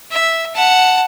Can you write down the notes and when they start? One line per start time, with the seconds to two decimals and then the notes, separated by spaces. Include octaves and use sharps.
0.11 E5
0.55 F#5 A5